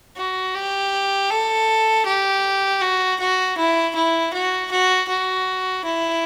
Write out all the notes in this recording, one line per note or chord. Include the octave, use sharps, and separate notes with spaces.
F#4
G4
A4
G4
F#4
F#4
E4
E4
F#4
F#4
F#4
E4